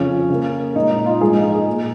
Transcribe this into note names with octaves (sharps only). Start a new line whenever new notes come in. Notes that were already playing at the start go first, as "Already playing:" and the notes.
Already playing: F2 C#3 F3 C#4
C#3 A#3
A#2 G#3 D#4
D#4
F4
G#2 F3 G#3 G#4
D#4
D#4
G#4
A#2 A#3